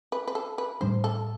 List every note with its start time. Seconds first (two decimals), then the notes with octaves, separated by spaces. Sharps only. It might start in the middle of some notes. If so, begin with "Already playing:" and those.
0.12 B4
0.28 B4
0.35 A4
0.58 B4
0.81 A2 G3 D4 C5
1.04 A4